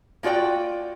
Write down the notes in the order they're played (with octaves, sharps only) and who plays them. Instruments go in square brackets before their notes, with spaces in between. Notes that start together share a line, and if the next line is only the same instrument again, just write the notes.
[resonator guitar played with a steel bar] A#3 F4 F#4 D5 G5